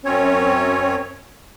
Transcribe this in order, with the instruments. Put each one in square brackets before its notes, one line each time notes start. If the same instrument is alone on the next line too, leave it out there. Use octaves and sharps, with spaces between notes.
[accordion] F#2 C4 C#4 C#5